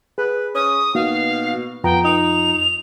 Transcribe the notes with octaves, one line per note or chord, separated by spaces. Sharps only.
G#4 B4
C#4 D#6
B2 A#3 D#4 F#4 F5
F2 B3 F4 G5 A#5
D#4 F7